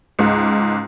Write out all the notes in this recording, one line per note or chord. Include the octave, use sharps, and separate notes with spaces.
C#2 G#2